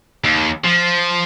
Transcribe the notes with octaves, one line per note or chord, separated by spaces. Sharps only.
D#2
F3